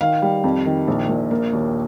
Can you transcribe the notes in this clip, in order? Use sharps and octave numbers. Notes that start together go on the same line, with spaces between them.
D#3 F5
G3
F2
D#3
A#1
A#2
A#3
D#2